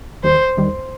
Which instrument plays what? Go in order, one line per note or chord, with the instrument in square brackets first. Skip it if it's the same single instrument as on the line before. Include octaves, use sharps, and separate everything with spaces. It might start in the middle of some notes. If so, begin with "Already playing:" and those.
[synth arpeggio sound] D#2 D#3 G3 [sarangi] C5
[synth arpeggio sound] D#2 D#3 G3